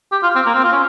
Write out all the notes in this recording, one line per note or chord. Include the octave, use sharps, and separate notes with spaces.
G4
F4
C4
A#3
C4
F4
C#4